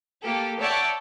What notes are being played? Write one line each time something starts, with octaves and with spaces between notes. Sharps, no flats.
A#3 G4 A4
C#5 D5 E5 F#5 G5 A5